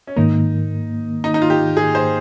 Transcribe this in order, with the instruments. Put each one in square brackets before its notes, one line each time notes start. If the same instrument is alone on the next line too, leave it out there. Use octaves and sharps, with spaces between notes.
[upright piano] C#4
[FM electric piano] G#2 D#3 A#3 [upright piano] D#4
[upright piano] D#4
D#4
F4
G4
G#4
C5